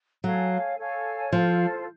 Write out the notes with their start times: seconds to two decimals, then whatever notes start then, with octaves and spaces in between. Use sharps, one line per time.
0.23 F#3 A4 C#5 F5 G#5
0.78 A4 C#5 F5 G#5
1.32 F3 F4 A4 C5